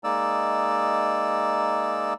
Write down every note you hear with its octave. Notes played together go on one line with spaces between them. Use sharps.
G#3 A#3 D#4 D5 E6